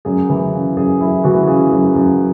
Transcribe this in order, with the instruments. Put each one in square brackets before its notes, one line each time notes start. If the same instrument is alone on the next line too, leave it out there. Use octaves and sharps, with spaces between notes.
[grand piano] F#2 G#4
E3
C#3
F#2 G#4
F#2 E4
E3 F#4
C#3 G#4
F#2
F#2